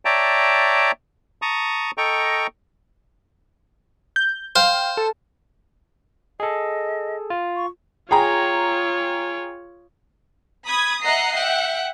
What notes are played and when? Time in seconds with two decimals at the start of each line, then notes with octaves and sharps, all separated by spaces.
0.05 C#5 D5 E5 G5 A5 A#5
1.42 A5 A#5 C#6 D#6
1.98 A4 D#5 G5 A#5 C#6
4.16 G6
4.56 C5 F5 G5
4.97 A4
6.40 G#4 A4 D#5
7.30 F4
7.56 C#6
8.11 F4 G#4 C#5 G5 A#5
10.66 B5 D#6 G#6
11.02 D#5 E5 F#5 A#5 C7
11.33 E5 F#5 G5